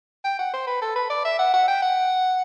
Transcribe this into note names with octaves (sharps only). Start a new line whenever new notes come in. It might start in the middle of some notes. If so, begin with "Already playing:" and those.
G5
F#5
C5
B4
A4
B4
D5
E5
F#5
F#5
G5
F#5